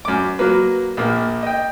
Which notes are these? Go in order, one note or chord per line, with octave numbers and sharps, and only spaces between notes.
F#2 D6
F#3 A#3 B4
A#1 A#3
D#5 G5